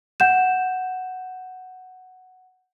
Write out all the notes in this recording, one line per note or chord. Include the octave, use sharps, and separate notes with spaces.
F#5 G6 E7